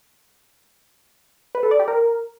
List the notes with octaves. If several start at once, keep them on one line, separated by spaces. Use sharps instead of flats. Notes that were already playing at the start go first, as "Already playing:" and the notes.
B4
A4
D5
G4
A#4